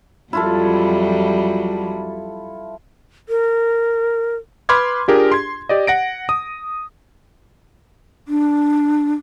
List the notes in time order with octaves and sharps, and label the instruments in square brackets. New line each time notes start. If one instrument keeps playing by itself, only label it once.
[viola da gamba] F2 F#3 G3 [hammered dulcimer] E4 F4 A4
[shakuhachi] A#4
[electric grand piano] B4 B5 C6 D6 F6 G#6
D4 F4 G4 G#4 A#4
C6 G#6
G4 D5 D#5
F#5 A#6 D7
D#6
[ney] D4